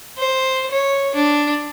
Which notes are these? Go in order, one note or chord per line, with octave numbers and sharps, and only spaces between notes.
C5
C#5
D4